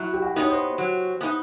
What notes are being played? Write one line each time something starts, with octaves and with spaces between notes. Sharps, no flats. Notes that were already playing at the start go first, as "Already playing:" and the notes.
Already playing: F#3 E4
G4
F#4
B3 D#4 C#5
C5
F#3
B3 D#4